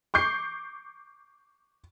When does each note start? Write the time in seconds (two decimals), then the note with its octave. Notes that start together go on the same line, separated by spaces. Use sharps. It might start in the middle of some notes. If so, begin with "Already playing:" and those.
0.14 C#6 D6 G6 C7